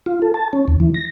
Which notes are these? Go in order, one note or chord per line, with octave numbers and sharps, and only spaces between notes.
F4
A4
A5
C#4
D#2
E3
A#6